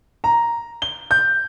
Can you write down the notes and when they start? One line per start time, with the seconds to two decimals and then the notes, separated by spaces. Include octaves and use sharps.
0.24 A#5
0.82 G7
1.11 G6